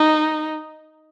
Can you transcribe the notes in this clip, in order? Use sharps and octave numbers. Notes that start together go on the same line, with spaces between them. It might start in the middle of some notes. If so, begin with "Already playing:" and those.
Already playing: D#4